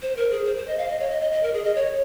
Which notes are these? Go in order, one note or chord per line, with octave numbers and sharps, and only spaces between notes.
C5
A#4
G#4
C5
C5
D#5
F5
D#5
C#5
D#5
D#5
D#5
A#4
G#4
D#5
C#5